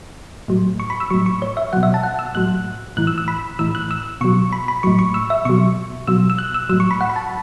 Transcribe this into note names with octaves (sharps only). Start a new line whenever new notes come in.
A2 F#3
C#6
B5
E6
A2 F#3 C#6
C#6
C#5
E5
B2 F#3 F#5
E5
A5
F#5
E6
A2 F#3 F#6
A2 E3 F#6
E6
E6
B5
A2 E3 E6
F#6
E6
B2 F#3 C#6
B5
B5
A2 F#3 C#6
C#6
E6
E5
B2 F#3 C#6
B2 F#3 E6
E6
F#6
E6
A2 F#3 E6
C#6
B5
F#5
B5
A5